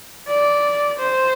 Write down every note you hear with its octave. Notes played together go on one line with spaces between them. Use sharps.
D5
C5